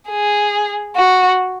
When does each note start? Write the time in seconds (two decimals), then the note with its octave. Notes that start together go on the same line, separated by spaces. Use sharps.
0.09 G#4
0.96 F#4